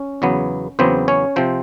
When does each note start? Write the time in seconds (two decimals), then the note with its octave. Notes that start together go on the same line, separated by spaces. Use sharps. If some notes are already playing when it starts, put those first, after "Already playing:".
Already playing: C#4
0.22 E2 C#3 F#3 B3
0.79 E2 C#3 F#3 B3 C4 C5
1.08 C#4 C#5
1.36 C3 F3 C4 C5